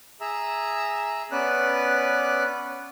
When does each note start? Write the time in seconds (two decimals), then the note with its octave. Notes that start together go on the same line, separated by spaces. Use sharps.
0.21 G#4 E5 A#5 E6
1.32 B3 C#4 B4 D5 F#6